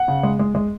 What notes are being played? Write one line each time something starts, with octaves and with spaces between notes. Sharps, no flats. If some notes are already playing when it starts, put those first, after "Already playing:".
Already playing: F#5
C#3
G#3
G#3
G#3